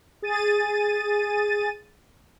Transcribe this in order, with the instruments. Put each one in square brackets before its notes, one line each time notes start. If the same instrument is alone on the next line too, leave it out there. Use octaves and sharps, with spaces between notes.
[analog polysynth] G#4 A6 D#7